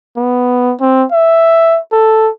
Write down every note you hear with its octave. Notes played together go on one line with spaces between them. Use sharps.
B3
C4
E5
A4